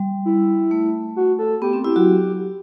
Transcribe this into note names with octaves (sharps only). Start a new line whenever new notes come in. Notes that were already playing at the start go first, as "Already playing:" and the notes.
Already playing: G3
E4
A3
F#4
A4
B3 G4
C4
E4 G4
F#3 F#4